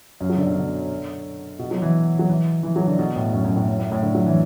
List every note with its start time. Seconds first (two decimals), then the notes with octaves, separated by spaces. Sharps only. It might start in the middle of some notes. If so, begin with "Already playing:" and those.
0.21 F#2
0.30 F#3
0.37 D3
0.47 B2
0.55 D3
1.59 B2
1.71 F#3
1.82 E3
2.19 F#3
2.29 E3
2.63 E3
2.76 F#3
2.87 D3
2.99 B2
3.16 A2
3.33 F#2
3.44 F#2
3.56 A2
3.68 F#2
3.79 A2
3.92 A2
4.03 D3
4.15 F#3
4.26 E3